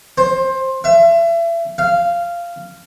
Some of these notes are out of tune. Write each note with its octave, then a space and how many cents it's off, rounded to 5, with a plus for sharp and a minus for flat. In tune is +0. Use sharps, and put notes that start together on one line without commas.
C5 +15
E5 +35
F5 -15